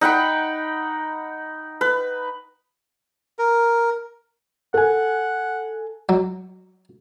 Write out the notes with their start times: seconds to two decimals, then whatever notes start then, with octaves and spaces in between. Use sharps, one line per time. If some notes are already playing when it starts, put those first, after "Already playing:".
0.01 D#4 F#5 G5 B5
1.81 B4
3.39 A#4
4.74 A4 F#5 G#5
6.09 F#3